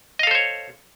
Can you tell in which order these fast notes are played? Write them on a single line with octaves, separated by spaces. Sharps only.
D#5 F5 A4 C5 C#5